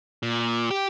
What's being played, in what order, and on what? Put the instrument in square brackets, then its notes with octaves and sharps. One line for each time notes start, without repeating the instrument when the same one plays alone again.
[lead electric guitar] A#2
G4